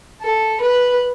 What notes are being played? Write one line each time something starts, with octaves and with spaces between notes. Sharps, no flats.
A4
B4